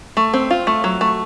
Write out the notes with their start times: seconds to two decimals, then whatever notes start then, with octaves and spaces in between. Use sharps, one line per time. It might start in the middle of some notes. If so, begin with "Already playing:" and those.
0.17 A3
0.34 C4
0.51 F4
0.67 A3
0.84 F#3
1.01 A3